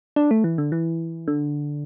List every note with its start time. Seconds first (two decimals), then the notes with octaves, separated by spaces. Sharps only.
0.16 D4
0.31 A3
0.44 E3
0.58 D3
0.72 E3
1.28 D3